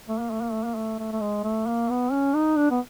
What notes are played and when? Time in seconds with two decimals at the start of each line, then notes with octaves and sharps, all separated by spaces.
0.08 A3
0.20 A#3
0.30 A3
0.41 A#3
0.53 A3
0.64 A#3
0.75 A3
0.99 A3
1.12 A3
1.21 G#3
1.44 A3
1.67 A#3
1.89 B3
2.12 C#4
2.34 D#4
2.57 D4
2.71 B3